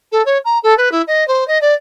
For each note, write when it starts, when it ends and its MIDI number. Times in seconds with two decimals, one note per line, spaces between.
0.12 0.22 69
0.25 0.38 73
0.44 0.58 82
0.63 0.76 69
0.77 0.91 71
0.91 1.01 64
1.07 1.26 75
1.27 1.46 72
1.47 1.58 75
1.61 1.73 74